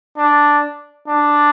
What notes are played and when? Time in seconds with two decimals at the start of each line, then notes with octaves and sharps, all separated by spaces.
0.17 D4
1.08 D4